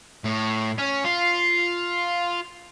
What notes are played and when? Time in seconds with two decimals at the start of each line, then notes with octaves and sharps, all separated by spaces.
0.24 A2
0.78 C#4
1.04 F4